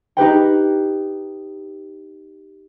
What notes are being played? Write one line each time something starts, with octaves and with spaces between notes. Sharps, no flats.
D#4 G4 B4 G5